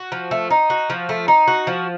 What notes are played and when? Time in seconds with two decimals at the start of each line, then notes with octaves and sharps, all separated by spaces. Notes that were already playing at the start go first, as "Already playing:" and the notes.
Already playing: F#4
0.12 F3
0.31 A3
0.50 D#4
0.70 F#4
0.90 F3
1.09 A3
1.28 D#4
1.47 F#4
1.67 F3